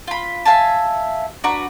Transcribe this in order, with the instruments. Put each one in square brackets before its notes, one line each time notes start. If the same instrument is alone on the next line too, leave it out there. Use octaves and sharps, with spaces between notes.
[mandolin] F4 B5
E5 F5 G#5 A5
D4 F#4 B4 A#5